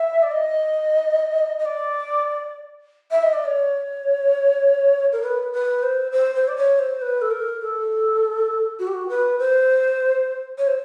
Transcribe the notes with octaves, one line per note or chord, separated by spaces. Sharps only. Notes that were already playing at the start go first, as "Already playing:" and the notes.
Already playing: E5
D5
D#5
D#5
D5
E5
D#5
D5
C#5
A#4
B4
B4
C5
C5
C5
D5
C#5
C5
B4
A4
A#4
A4
F#4
G4
F#4
B4
C5
C#5
C5